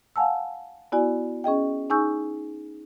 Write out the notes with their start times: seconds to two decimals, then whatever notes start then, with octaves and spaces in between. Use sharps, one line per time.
0.16 F5 F#5 G#5 A5 E6
0.92 B3 E4 F#4 D5 G#5
1.44 C#4 G#4 D#5 G5
1.90 D#4 G#4 G#5 C#6 E6 G6